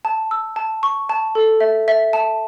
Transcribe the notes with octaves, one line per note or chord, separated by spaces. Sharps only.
A5
E6
A5
C#6
A5
A4
E5
E5
A5